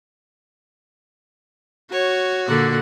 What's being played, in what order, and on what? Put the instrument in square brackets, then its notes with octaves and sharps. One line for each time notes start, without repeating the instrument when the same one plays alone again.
[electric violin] F#4 [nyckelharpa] C#5
[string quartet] A#2 D3 [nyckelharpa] F#5